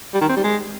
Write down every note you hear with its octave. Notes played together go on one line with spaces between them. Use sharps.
G3
D#3
C4
G3
G#3